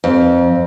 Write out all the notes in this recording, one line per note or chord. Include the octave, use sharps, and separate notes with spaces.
F2